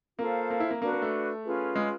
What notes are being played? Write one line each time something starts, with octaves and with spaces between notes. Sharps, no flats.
A#3 F4 A4 C5 F5
A#3
E4
A#3
A#3 D4 F#4 B4
A#3
A3
C#4 F4 G#4 B4
G#3